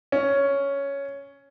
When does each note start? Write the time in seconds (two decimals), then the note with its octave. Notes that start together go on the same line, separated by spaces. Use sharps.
0.12 C#4